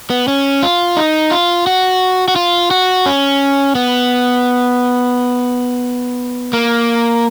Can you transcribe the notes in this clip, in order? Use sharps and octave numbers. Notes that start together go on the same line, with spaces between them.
B3
C#4
F4
D#4
F4
F#4
F#4
F4
F#4
C#4
B3
A#3